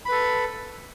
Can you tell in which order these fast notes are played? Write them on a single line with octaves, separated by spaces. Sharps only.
B5 B4 A4